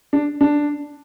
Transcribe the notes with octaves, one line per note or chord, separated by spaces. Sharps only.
D4
D4